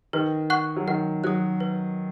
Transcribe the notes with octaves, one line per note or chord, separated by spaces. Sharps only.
D#3 B4
F#5 C#6 F#6
F#3
D#3 F#5
F#3 D#6 F#6
B4